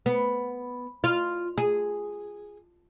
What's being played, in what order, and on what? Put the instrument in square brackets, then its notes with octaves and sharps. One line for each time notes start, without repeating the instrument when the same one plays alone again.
[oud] B3
F4
G#4